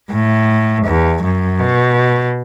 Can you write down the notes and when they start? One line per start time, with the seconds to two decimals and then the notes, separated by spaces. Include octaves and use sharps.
0.11 A2
0.85 E2
1.23 F#2
1.59 B2